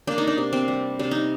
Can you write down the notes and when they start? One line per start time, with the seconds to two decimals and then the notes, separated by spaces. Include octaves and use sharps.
0.07 A#3 D4
0.18 D#4
0.27 D4
0.38 C3
0.53 C4
0.68 G3
0.99 C3 D4
1.11 D#4